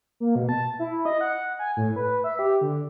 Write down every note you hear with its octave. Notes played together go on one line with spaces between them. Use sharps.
A#3
B2
A5
E4
D#5
F#5
G#5
A2
B4
E5
G4
D3